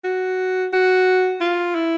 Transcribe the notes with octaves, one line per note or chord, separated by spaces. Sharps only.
F#4
F#4
F4
E4